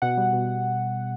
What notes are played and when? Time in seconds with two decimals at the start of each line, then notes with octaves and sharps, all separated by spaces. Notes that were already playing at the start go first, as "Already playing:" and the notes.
0.02 B2 F#5
0.17 G3
0.33 B2